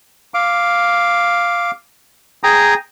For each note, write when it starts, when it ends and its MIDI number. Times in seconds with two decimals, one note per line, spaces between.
0.34 1.71 77
0.34 1.71 86
2.44 2.74 68
2.44 2.74 79
2.44 2.74 82
2.44 2.74 87